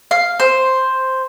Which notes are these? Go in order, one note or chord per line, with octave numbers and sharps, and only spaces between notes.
F5
C5